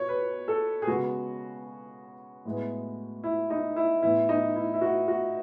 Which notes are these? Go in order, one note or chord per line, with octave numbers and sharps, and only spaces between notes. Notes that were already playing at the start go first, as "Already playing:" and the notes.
Already playing: B2 C#5
B4
A4
G#4
C#3 G#3 B3 F#4
A2 G#3 B3
E4
D#4
E4
A2 E3 B3 E4
D#4
E4
E4
F#4
F#4